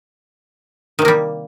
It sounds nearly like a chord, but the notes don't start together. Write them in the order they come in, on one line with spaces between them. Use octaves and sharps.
D#3 C3 A#3 G3